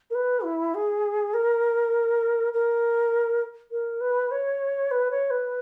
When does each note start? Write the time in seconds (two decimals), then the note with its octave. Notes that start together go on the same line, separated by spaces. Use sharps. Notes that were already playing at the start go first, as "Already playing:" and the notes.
0.10 A#4
0.14 B4
0.43 E4
0.74 G#4
1.33 A#4
2.53 A#4
3.71 A#4
4.00 B4
4.31 C#5
4.91 B4
5.11 C#5
5.30 B4